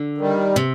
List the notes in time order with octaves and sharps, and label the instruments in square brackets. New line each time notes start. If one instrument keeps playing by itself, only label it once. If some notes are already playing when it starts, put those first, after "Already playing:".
Already playing: [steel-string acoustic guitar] D3
[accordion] D#3 G3
[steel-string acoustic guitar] C3